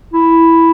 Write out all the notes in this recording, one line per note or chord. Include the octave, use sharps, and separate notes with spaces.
E4